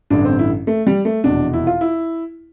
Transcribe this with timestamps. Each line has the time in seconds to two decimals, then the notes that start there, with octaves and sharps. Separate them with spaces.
0.10 A1 G2 D3 D4
0.25 C4
0.39 E4
0.67 A3
0.87 G3
1.05 A3
1.24 F1 E2 B2 D4
1.53 E4
1.67 F4
1.81 E4